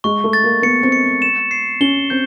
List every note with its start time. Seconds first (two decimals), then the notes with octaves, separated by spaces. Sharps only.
0.04 G#3 C#6
0.24 A3
0.33 A6
0.44 A#3
0.62 B3 C#7
0.83 C4
0.92 C#7
1.22 E7
1.51 C7
1.81 C#4 G7
2.10 C4 G6